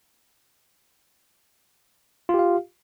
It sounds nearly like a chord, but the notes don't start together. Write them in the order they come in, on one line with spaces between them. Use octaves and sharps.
F4 G4 F5